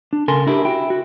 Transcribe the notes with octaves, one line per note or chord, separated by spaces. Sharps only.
D4
C#3 A4 A#4 G#5 C6
D4 E4 G4 A#4
E4 F#4 G5
F#4